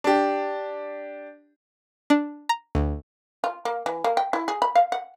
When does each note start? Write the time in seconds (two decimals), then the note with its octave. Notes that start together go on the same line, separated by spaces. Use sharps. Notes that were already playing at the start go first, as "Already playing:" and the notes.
0.04 D4 G4
2.10 D4
2.49 A#5
2.75 D2
3.44 F4
3.65 A#3
3.86 E3
4.04 A#3
4.17 G5
4.33 E4
4.48 G#4
4.62 B5
4.75 F5
4.92 F#5